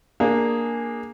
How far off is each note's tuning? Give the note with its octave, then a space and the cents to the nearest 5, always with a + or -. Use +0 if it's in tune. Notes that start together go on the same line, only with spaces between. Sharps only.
A#3 +0 D4 +0 G#4 +0